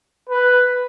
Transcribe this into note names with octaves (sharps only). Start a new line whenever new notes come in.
B4